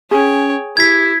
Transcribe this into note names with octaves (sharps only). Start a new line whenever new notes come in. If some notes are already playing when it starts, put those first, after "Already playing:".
C#4 G#4 C#5 G5
E4 G4 G#6 B6